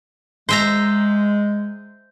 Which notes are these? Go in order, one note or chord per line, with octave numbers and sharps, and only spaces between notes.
G#3 C5 E5 A#5